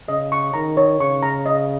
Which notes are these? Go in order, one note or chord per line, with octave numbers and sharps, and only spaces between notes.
C#3 D#5
C#6
D#3 A#5
C#5
C#3 C#6
A#5
D#5